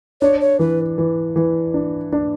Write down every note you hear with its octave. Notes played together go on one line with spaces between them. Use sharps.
D4 C#5
C#5
E3 B4
E3
E3
D4
D4